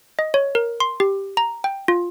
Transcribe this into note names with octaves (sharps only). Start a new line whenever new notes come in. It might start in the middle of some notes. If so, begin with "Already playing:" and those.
D#5
C#5
A#4
C6
G4
A#5
G5
F4